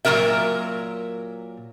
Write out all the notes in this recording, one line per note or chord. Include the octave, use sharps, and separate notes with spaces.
A#2 F#3 G#3 F#4 A#4 E5